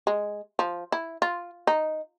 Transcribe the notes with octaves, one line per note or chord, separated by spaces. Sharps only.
G#3
F3
E4
F4
D#4